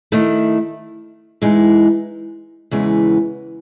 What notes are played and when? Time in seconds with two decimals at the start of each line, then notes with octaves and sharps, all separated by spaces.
0.12 D#3 A3 E4
1.42 E3 G#3 D#4
2.71 E2 C#3 E3 G#3 B3